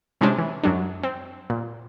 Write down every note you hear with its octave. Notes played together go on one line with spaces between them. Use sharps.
A2 C3 G#3 C#4 D4
E3
F#2 F#3 D4
C4
A#2